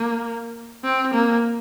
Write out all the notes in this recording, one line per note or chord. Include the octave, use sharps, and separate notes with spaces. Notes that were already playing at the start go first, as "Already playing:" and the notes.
Already playing: A#3
C4
A#3